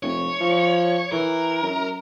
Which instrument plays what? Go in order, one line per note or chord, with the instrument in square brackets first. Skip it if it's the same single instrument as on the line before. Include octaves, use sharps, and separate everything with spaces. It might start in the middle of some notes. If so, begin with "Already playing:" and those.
[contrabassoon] F1 [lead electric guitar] C#5
[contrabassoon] F3
[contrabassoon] E3 [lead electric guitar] A#4
[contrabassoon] F#2